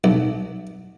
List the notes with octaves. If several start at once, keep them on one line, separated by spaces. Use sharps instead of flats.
B1